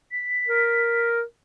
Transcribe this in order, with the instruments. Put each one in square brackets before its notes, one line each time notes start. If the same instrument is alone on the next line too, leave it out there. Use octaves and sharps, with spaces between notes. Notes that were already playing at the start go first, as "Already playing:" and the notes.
[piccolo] B6
[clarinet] A#4